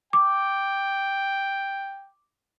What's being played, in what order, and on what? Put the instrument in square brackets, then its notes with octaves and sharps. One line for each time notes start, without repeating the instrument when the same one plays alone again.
[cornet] G5 [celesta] D6